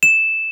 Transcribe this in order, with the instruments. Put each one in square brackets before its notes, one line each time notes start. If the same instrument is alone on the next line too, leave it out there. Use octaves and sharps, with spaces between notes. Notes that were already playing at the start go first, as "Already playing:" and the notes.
[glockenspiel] E7